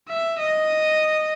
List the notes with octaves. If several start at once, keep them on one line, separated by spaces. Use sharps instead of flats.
E5
D#5